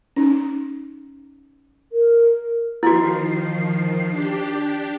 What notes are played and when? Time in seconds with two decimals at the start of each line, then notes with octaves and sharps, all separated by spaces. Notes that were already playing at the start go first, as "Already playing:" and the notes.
0.16 C#4 D#4
1.92 A#4
2.83 D#3 F3 E4 F#4 C7
4.10 D4 G4